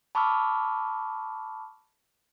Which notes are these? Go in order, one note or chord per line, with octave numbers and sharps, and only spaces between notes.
A5 B5 C#6 D6 E6 F6